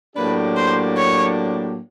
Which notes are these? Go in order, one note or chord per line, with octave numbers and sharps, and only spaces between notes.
A2 F#3 A#3 D4 G4 B4
C5
C#5